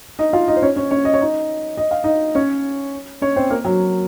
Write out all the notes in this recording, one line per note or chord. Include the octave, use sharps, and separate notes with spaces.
D#4 D#5
F4 F5
D#4 D#5
C5
C#4 C#5
C#4 C#5
C#4 C#5
D#5
C#5
D#4 D#5
D#5
F5
D#4 D#5
C#4 C#5
C#4 C#5
C4 C5
A#3 A#4
F#3 F#4